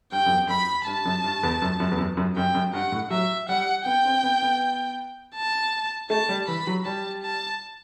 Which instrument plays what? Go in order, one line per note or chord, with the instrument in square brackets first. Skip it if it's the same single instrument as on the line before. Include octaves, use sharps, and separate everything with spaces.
[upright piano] G2 [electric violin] G5
[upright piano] F#2
E2
[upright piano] F#2 [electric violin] B5
[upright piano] G2 [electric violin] A5
[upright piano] F#2
G2
E2
F#2
F#2
E2
F#2
F#2
[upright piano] F#2 [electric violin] G5
[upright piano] F#2
[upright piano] G2 [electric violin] F#5
[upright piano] A2
[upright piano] F#3 [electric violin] E5
[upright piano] G3 [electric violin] F#5
[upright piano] B3 [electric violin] G5
[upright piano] C4
B3
B3
[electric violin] A5
[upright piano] A3 [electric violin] A5
[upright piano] G3
[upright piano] E3 [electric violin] B5
[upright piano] F#3
[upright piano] G3 [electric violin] A5
[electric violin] A5